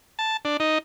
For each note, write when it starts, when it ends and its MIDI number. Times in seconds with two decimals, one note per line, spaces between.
0.19 0.37 81
0.45 0.57 62
0.60 0.78 63